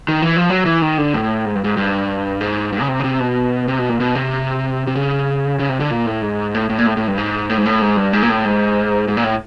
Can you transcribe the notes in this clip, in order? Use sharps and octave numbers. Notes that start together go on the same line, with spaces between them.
D#3
E3
F3
F#3
E3
D#3
D3
A2
G#2
G2
G#2
G2
G#2
G2
C#3
C3
C#3
C3
B2
C3
B2
A#2
B2
C3
C3
C#3
C#3
C3
D3
A#2
A2
G#2
A2
A2
A#2
A2
A2
G2
G#2
A2
G#2
A2
G#2
G2
G#2
A#2
A2
G#2
G#2
A#2
A2